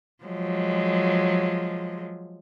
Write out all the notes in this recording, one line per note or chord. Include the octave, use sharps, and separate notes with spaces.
F3 F#3 G#3